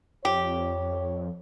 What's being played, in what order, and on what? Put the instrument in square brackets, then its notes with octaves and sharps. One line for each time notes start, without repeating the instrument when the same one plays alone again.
[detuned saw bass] F2 [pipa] G4 [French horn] C#5